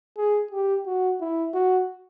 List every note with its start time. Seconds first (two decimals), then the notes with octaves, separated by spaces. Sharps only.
0.17 G#4
0.51 G4
0.86 F#4
1.21 E4
1.54 F#4